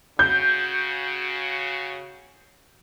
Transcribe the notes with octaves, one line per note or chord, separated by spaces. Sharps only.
C#3 F#4 G6